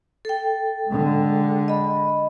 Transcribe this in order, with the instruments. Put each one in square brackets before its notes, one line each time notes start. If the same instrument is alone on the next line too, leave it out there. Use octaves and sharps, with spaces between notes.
[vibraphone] A4 G5
[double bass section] D3 G#3
[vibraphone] D#5 B5